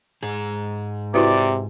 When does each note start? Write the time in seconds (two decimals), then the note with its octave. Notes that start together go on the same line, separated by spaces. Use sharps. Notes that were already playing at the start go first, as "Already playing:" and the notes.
0.23 G#2 G#4
1.14 C3 E4 F#4 B4 D5